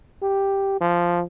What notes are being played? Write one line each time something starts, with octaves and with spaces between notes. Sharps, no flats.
G4
F3